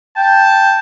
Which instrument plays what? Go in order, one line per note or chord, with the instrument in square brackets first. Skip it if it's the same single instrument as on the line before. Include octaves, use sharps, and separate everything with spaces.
[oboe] G5 [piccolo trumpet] A5